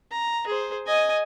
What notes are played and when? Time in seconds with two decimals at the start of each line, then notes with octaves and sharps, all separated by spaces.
0.12 A#5
0.47 G#4 C5
0.87 D#5 G#5